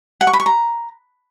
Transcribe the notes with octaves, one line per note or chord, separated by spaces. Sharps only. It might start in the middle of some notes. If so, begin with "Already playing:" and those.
F#5
C#6
B5
C#6
A#5